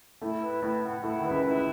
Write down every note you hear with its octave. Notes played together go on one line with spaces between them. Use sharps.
A2 A3 E4
B4
A2 A3 E4
F#5
A2 A3 E4
D#3 B4
C#2 C#3
E4